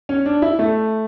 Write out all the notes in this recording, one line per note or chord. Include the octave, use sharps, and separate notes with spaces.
C#4
D4
E4
A3